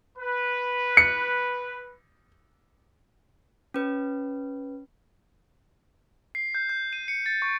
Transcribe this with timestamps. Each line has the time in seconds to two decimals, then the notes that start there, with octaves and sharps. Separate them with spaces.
0.18 B4
0.97 C#7
3.74 C#4 B4
6.35 C7
6.55 G6
6.69 G6
6.93 D#7
7.08 C#7
7.26 A6
7.42 C#6